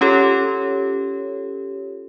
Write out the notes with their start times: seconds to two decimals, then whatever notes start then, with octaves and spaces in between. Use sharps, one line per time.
0.01 C#4 F4 G4 A4 C#5